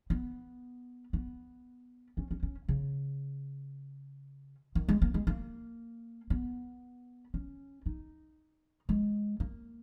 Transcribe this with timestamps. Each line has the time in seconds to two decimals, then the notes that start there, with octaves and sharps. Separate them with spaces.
0.10 B3
1.13 B3
2.17 C#4
2.31 C#4
2.43 C#4
2.69 C#3
4.75 D#3
4.89 G#3
5.02 A#3
5.14 G#3
5.27 A#3
6.30 B3
7.34 C#4
7.86 D#4
8.89 G#3
9.40 A#3